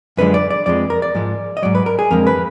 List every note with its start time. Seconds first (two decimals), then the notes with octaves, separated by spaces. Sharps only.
0.17 F#2 D3 F3 G#3 B4
0.34 D5
0.50 D5
0.66 F2 F3 G#3 D5
0.90 A#4
1.02 D5
1.15 G#2 F3 G#3
1.57 D#5
1.63 G#2 F#3 D5
1.75 B4
1.86 A#4
1.99 G#4
2.11 F2 D3 F3 G#3 A#4
2.27 B4